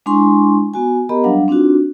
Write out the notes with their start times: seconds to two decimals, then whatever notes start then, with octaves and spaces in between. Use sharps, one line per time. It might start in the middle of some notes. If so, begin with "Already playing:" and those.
0.06 G#3 D4 E4 G#5 C6 C#6
0.74 B3 F#4 G#5
1.09 B3 G4 A#4 D#5 A#5 B5
1.24 F#3 G3 D4 F5 F#5
1.48 C4 D4 D#4 F4 F#4